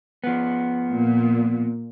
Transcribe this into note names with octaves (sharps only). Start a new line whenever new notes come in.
F3 B3
A#2